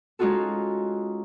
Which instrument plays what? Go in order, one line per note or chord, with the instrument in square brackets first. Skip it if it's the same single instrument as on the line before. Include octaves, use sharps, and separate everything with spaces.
[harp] G#3 C#4 D#4 F4 F#4 A4